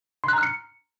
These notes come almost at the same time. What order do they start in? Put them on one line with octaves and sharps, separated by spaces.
C6 F#6 A#5 F6 C#7